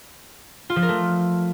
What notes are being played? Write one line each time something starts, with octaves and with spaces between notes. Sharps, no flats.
F4
F3
A#4
A3